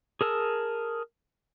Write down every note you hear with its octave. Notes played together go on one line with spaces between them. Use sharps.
G#4 A#4 A5 E6